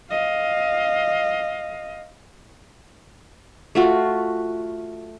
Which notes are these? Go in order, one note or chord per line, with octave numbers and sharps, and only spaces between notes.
D#5 F5
A3 F4 F#4